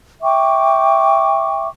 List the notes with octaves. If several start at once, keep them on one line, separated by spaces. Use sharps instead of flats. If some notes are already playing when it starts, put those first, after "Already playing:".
E5 G5 C#6 D6